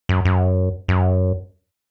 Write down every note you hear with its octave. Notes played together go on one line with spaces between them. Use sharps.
F#2
F#2
F#2